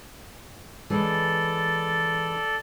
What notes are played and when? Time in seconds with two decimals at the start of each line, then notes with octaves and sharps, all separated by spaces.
0.90 E3 G#3 C#4 A4 D5